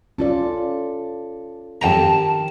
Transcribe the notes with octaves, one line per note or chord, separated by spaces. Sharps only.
C#4 F4 A4 D5
F2 D#3 G4 G5 A5 A#5